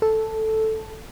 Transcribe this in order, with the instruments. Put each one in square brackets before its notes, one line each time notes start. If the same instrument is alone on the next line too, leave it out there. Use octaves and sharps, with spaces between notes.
[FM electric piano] A4